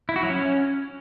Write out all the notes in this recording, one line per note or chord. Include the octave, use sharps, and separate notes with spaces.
E4
F#4
F#3
C#4